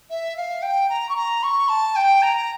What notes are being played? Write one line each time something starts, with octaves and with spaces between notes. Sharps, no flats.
E5
F5
G5
A#5
C#6
A#5
C#6
A5
G5
A#5